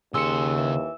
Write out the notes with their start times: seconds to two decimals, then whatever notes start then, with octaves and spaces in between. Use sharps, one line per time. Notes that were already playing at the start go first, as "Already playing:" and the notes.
0.14 D#2 C#3 G#4 C6 E6 C#7
0.58 E3 E7